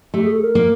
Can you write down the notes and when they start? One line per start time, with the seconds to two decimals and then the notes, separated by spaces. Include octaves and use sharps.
0.14 A3 G4
0.24 G#4
0.32 A4
0.42 A#4
0.55 A#3